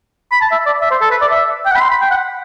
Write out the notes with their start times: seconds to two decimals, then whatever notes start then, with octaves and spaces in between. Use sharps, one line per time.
0.32 B5
0.42 A5
0.52 E5
0.66 D5
0.81 E5
0.91 C5
1.01 A4
1.11 B4
1.21 D5
1.31 E5
1.66 G5
1.71 F#5
1.76 B5
1.81 C6
1.91 B5
2.01 G5
2.11 F#5